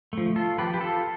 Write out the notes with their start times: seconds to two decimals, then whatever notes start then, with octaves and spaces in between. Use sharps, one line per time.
0.13 F3 A3
0.36 F4 A4
0.58 F3 G4 B4
0.74 G4
0.81 F4 A4